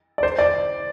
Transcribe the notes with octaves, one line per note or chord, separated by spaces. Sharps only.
D5
C5
D5